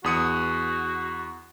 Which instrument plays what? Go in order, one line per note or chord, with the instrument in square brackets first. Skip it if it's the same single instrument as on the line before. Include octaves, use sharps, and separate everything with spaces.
[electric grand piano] E2 D#6 C#7 [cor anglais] F#4